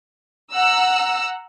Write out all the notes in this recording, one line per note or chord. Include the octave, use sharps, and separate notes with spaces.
F#5 A#5 E6